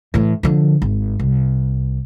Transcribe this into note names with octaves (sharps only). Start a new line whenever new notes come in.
A2 E3
D3 F3
G#1
C2